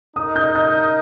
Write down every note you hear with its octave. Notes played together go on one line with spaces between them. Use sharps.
D#4 A#4 D#5 D#6
G6
G6